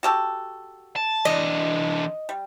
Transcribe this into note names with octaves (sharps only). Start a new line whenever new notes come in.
F#4 G4 A4
A5
E3 D4 D#5
G3